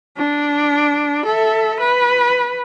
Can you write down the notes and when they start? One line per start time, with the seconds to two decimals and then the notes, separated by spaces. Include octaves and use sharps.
0.18 D4
1.25 A4 E5
1.80 B4